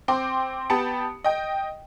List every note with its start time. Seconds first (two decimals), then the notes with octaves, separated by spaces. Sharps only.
0.08 C4 G5 C6 D6
0.70 B3 G4 A5 B5 C#7
1.24 D#5 G5